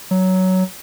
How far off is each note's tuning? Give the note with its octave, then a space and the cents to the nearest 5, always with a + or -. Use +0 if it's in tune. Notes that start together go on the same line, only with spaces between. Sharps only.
F#3 +10